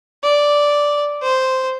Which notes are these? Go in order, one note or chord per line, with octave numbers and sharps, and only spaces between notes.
D5
C5